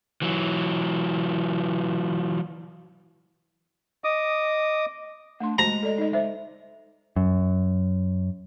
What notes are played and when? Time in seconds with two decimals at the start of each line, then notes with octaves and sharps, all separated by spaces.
0.22 E3 F#3
4.04 D#5 D6 D#6
5.40 A3 D4 C6
5.58 G#3 F#4 C5 A5 A#5
5.83 A4 D5 D#5
5.98 D#4 D#5
6.13 C5 E5
7.16 F#2